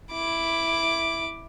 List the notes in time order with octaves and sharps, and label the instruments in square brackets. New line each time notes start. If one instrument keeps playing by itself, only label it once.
[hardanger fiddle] E4 D6